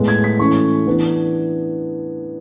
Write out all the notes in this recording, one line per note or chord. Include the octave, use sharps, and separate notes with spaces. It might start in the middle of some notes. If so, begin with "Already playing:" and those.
Already playing: A2 G#3 B3
G#6
B6
E3 A3 C#4 C#6
E3 B3 D4